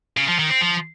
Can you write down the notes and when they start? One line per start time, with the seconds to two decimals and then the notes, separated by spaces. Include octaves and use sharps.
0.17 C#3
0.28 F3
0.39 D#3
0.50 C4
0.61 F3